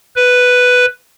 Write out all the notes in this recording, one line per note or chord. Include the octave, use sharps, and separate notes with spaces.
B4